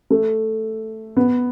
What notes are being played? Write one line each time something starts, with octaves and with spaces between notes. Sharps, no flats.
A3
B3